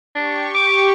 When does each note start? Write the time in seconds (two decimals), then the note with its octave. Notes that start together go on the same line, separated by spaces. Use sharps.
0.15 D4 G4 C#6
0.55 D6